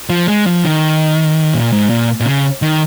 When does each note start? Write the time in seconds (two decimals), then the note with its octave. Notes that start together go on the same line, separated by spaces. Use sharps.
0.10 F3
0.28 G#3
0.46 F3
0.64 D#3
1.54 A#2
1.73 G#2
1.90 A#2
2.20 A#2
2.26 C#3
2.62 D#3